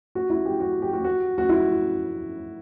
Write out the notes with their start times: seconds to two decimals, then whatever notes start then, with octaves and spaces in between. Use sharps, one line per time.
0.15 F#4
0.30 E4
0.46 G4
0.60 F#4
0.82 G4
0.93 F#4
1.04 F#4
1.38 F#4
1.49 E4